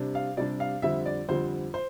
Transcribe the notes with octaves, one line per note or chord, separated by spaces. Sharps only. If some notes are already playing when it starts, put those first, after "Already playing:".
Already playing: C3 G3 D4
F5
C3 G3 D4 D5
F5
F2 D3 G3 C4 E5
D5
F2 D3 G3 C4 C5
C5